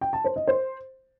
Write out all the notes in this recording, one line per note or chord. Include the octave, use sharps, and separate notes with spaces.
G5
A5
C5
D#5
C5